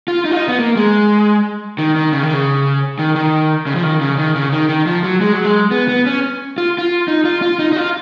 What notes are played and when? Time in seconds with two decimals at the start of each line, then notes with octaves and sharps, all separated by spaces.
0.08 F4
0.25 D#4
0.31 F4
0.37 D#4
0.48 B3
0.59 A#3
0.77 G#3
1.79 D#3
1.96 D#3
2.13 C#3
2.23 D#3
2.34 C#3
2.99 D#3
3.16 D#3
3.67 C#3
3.76 F3
3.83 D#3
4.01 C#3
4.18 D#3
4.36 C#3
4.52 D#3
4.69 D#3
4.87 F3
5.04 F#3
5.21 G#3
5.33 F#3
5.45 G#3
5.71 B3
5.89 B3
6.06 C#4
6.58 F4
6.78 F4
7.08 D#4
7.25 F4
7.42 F4
7.59 D#4
7.72 D#4
7.76 F4